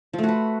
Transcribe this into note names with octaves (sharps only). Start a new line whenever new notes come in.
F3
A3
F#4
B4